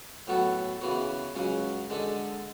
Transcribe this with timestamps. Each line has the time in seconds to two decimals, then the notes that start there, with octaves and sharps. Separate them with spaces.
0.27 A2 F#3 B3 F#4 A4
0.81 C#3 E3 B3 F#4
1.35 C#2 C#3 F#3 C#4 F#4
1.90 D3 G#3 D4 A4